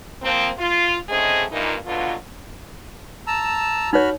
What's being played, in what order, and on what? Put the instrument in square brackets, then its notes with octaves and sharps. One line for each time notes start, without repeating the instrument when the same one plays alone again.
[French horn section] F3 A#3 C4
F4
G#2 C#3 A3 C4 G#4 D#5
G2 A#2 E3 A#3 D#4 F4
B2 D3 F#3 B3 F4
[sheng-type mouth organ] A5 A#5 E6
[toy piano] D#4 C#5 [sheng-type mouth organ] F#4 B5 F6